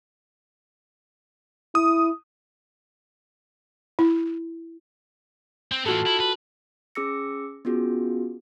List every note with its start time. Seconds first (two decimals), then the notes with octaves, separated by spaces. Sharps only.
1.75 E4 D#6
3.99 E4
5.72 C4
5.86 A2 E3 F4 F#4 A4
6.06 E4
6.20 B4
6.95 C#4 G#4 D6 E6 A#6 C#7
7.65 B3 C#4 F4 F#4 G#4